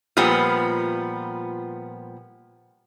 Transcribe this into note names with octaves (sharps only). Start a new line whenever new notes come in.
A#2 F3 G3 B3